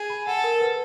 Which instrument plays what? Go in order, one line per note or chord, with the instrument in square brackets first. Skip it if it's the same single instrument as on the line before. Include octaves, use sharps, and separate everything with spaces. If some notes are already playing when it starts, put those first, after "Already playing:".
Already playing: [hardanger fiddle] G#4
[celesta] B5
[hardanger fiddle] A4 [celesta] F#5
[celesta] A#4
B4